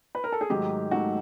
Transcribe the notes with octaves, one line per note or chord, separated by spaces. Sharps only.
B4
A#4
A4
G#4
G#2 D#3 F#3 A3 G4
G#2 D#3 F#3 A3 F#4